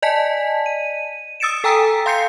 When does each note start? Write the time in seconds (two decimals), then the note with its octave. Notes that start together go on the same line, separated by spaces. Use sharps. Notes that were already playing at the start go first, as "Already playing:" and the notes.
0.02 D5 D#5 G#5 A5 B6
0.66 D#7
1.40 D#6 E6 A6 C#7 D7 E7
1.64 A4 G5 G#5 A#5 E6 B6
2.06 F5 C6 G6 C7 C#7